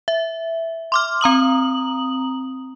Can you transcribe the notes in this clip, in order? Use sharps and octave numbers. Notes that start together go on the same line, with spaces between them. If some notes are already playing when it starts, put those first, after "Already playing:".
E5
C6 D6 F6
C4 A#5 D#6 F#7